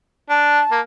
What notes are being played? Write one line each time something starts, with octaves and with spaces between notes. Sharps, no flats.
D4 A5
A#3